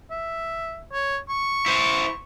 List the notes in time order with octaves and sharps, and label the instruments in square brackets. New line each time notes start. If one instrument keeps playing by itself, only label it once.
[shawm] E5
C#5
C#6
[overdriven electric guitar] E4 C5